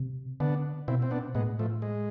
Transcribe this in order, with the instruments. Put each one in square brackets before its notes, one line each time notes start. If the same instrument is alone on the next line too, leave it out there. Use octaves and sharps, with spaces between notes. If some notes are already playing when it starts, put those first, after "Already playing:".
Already playing: [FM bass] C3
[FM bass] D3 [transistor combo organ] B3 D4
[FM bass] B2 [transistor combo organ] C4 E4
[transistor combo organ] C4
B3 D4
[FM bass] A2 [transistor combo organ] G#3 B3
[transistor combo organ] F3 A3
G#3